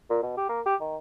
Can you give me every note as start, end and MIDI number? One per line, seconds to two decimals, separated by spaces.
0.10 0.18 46
0.22 0.37 47
0.37 0.47 67
0.49 0.61 58
0.66 0.75 67
0.81 0.96 51